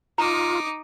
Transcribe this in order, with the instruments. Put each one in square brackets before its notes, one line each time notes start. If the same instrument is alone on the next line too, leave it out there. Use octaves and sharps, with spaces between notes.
[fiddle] D#4 [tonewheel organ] F4 [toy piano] A#5 [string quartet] D6 D#6